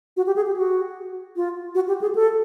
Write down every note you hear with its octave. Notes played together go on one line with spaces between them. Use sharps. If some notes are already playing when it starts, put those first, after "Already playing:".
F#4
G4
G#4
G4
F#4
F4
F#4
G4
G#4
A4